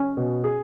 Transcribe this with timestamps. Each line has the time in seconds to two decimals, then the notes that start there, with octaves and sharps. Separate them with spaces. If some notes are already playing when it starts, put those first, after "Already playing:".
Already playing: C#4
0.17 B2
0.44 G#4